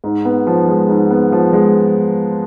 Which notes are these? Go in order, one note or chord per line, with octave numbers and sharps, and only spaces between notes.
G#2
B3
F3
G#3
G#2
B3
F3
G#3